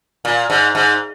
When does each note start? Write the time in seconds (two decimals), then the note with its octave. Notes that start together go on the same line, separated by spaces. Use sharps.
0.25 A#2
0.50 G#2
0.75 G#2